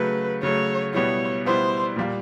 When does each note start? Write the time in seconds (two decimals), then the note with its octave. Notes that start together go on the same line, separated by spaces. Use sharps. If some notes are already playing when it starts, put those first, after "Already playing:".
Already playing: C#3 F#3 A3 B4
0.43 C#3 F#3 A3 C#5
0.94 B2 G3 B3 E4 C#5
1.45 B2 G3 B3 E4 C5
1.96 A#2 G3 A#3